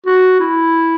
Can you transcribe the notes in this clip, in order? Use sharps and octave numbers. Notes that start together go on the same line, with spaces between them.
F#4
E4